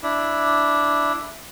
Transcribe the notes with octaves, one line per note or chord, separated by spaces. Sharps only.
D4 E4